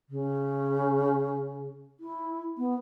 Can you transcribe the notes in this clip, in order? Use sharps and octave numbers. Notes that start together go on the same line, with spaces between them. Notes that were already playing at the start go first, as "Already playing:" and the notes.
C#3
E4
B3